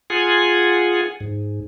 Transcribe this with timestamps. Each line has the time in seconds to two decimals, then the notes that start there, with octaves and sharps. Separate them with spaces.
0.10 F4 G#4 F#5 G#5
1.20 G#2